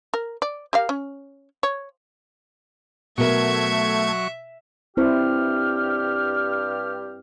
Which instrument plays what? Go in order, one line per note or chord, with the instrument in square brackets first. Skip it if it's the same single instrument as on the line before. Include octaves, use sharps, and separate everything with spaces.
[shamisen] A#4
D5
G4 A#4 F5
C#4
C#5
[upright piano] B2 A#4 [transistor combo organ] F#3 C#6 [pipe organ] A3 G#6 [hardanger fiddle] E5
[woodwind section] G2 G4 F6 [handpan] C4 E4 C5